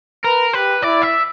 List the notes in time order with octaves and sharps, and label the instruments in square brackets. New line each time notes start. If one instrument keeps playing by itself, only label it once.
[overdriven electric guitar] A#4 [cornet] B4
[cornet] G4 [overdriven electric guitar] B4
[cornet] E4 [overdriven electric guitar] D5
[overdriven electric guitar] E5